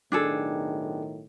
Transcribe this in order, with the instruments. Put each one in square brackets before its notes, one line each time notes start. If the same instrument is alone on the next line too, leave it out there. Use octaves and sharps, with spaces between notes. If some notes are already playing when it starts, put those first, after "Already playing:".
[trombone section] B1 A2 D#3 [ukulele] D4 G#4 A4